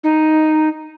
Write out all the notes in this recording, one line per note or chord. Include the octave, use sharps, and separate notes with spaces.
D#4